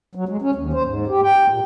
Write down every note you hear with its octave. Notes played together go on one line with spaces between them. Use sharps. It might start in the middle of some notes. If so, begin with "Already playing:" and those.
F#3
G#3
C#4
D#2
C5
G#2
G4
G5
A#2